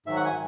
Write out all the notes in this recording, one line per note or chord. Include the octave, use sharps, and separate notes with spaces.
G#2 D#3 F#3 E5
F#5
G#5